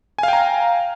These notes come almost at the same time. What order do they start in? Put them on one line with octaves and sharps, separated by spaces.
G#5 F5 G5 A#5